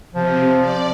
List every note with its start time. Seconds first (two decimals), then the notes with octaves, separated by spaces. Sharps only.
0.14 C3 F3
0.59 D5